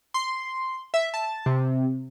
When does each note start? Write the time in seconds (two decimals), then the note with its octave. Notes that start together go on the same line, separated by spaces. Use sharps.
0.14 C6
0.94 E5
1.14 A5
1.46 C3